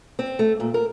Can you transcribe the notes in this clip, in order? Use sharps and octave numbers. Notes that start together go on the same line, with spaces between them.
C4
A3
A#2
A#4